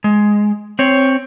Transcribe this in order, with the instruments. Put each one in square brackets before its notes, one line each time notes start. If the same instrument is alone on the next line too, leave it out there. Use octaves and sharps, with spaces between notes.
[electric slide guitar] G#3
C4 C#5